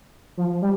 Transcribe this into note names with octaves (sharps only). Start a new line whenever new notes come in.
F3
G3